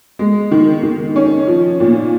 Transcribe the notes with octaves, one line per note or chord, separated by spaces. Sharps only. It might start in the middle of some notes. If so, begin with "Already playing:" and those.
G#3
D#3
D#3
C#4
F3
A#2